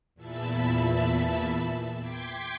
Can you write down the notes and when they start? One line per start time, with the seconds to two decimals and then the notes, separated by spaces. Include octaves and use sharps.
0.15 E2 A#2 E5 A5 B5
1.99 G5 C6 D6 G#6 B6